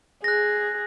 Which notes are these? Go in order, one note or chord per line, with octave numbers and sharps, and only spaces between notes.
G#4 F#6 A#6